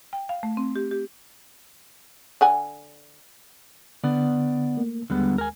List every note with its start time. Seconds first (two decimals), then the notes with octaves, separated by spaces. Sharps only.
0.13 G5
0.29 F5
0.43 A3
0.57 C4
0.76 G4
0.91 G4
2.41 D3 F#5 G#5
4.04 D3 B3 D5
4.77 A3 A#3
5.10 D#2 D3 G3 G#3 B3
5.38 A#4 G#5